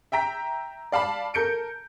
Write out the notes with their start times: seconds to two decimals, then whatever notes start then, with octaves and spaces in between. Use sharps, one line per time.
0.12 E5 G5 A#5 B6
0.92 D5 F5 A5 B5
1.34 A4 A#4 G6 C#7 D7